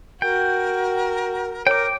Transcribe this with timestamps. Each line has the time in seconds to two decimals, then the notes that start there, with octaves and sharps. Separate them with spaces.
0.22 F#4 A#4 G5
1.67 A#4 C#5 G5 D6